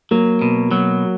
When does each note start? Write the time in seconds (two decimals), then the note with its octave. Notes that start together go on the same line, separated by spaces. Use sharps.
0.11 F#3 A#3
0.42 B2
0.71 F#3